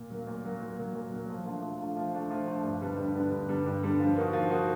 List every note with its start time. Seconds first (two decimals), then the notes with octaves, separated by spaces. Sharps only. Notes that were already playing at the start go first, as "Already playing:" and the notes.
Already playing: A#2
0.10 F#3 A#3
0.27 A#2
0.44 F#3 A#3
0.61 A#2
0.78 F#3 A#3
0.95 A#2
1.12 F#3 A#3
1.29 F3
1.45 A3 D4 F4
1.62 F3
1.80 A3 D4 F4
1.97 F3
2.13 A3 D4 F4
2.31 F3
2.47 A3 D4 F4
2.64 G2
2.82 D3 G3 B3 D4
2.98 G2
3.15 D3 G3 B3 D4
3.31 G2
3.49 D3 G3 B3 D4
3.66 G2
3.83 D3 G3 B3 D4
3.99 F3
4.16 A#3 D#4 F#4
4.33 F3
4.50 A#3 D#4 F#4